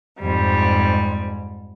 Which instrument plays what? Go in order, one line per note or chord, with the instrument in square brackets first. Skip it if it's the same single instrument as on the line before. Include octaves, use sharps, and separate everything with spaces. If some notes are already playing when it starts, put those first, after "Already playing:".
[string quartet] F2 G#2 G3